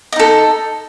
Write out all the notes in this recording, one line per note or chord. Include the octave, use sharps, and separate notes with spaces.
D#4 A4 D#5